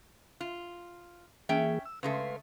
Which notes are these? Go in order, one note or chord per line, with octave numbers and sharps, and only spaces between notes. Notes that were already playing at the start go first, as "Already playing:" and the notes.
F4
E3 A#3 C#4 G#4 E5 G5
E6
C#3 G#3 A3 B4 F5 C6